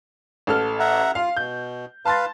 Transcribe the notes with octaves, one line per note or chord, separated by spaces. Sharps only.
A1 A4 F6
E5 F#5 A#5
F4 F5
B2 G6
B4 F5 A5 C6 A6